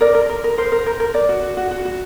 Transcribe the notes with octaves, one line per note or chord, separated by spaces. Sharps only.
A#4 D5
A#4
A#4
A#4
A#4 C5
A#4
A#4
A#4
A#4 D5
F#4
F#4
F#4
F#4
F#4